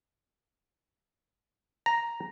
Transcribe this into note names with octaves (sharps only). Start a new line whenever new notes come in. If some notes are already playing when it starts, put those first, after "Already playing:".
A#5